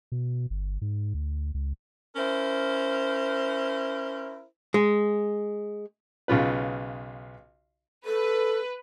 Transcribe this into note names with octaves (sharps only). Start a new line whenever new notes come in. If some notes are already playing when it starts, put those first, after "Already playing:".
B2
G1
G#2
D2
C#2
C#4 E4 A#4 C5
G#3
B1 C#3 F4 B4
A4 B4